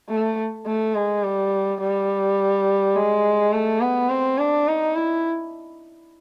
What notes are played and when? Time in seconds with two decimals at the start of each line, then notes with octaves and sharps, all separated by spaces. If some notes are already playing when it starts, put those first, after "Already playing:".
0.09 A3
0.66 A3
0.95 G#3
1.23 G3
1.81 G3
2.96 G#3
3.53 A3
3.81 B3
4.09 C4
4.39 D4
4.67 D#4
4.96 E4